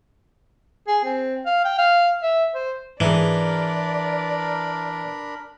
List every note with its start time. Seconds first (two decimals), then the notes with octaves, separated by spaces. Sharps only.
0.88 G#4
1.04 C4
1.46 F5
1.65 G5
1.78 F5
2.23 E5
2.54 C5
3.00 G#2 E3 D4 G#4 A#4 D5 B5